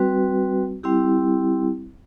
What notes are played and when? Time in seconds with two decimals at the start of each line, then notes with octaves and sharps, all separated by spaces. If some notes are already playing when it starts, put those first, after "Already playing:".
Already playing: G3 C4 F#4 B4
0.83 G3 C4 E4 G4